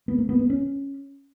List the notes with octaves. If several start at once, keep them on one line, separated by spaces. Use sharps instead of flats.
B3
A#3
B3
B3
C#4